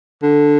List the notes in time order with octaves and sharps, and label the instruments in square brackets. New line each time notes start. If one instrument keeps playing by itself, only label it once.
[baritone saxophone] D3